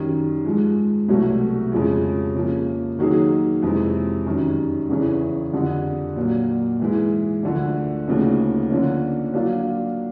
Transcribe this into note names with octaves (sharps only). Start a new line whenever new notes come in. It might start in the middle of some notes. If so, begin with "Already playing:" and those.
Already playing: F#2 D#3 G3
G#2 F3 G#3
C2 B2 F#3 A3
F2 C#3 F3 G#3
C#3 F3 A#3
D#3 F#3 A#3 D#4 G#4
F2 C3 E3 G#3 C4
F#2 D#3 G3
E2 C#3 E3
F2 D3 G3
A#2 F#3 A#3
G#2 E3 G#3
D2 D3 F3 A3
D2 C#3 F3 A#3 D#4
D3 F3 A#3 C#4
F#3 A#3 D4 F4